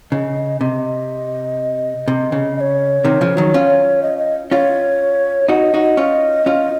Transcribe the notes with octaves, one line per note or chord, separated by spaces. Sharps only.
C#3 D#5
C3 D#5
C3
C#3
D#5
C#5
C3 D#3
C#3 F3
D#3 F#3
C#4 F4
D#5
D#5
C#4 F4 C#5
D#4 F#4 D#5
D#4 F#4
C#4 F4
C#4 F4